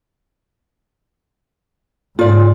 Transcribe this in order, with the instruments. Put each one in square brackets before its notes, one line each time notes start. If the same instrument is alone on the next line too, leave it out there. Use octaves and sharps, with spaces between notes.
[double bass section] G#2 [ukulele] F4 D5